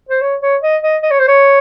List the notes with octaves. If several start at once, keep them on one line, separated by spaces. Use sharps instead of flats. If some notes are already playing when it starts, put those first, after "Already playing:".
C5
C#5
C#5
D#5
D#5
D#5
C#5
C5
C#5